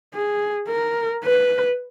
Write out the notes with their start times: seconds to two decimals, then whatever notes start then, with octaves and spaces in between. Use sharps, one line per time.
0.15 G#4
0.69 A#4
1.24 B4